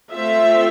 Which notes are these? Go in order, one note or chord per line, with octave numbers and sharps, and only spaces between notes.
A3 C4 F4 E5